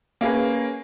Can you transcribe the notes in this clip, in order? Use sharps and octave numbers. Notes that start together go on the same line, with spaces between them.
A#3 C#4 G#4 B4